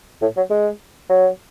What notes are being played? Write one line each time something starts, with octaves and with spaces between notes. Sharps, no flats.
A2
F#3
G#3
F#3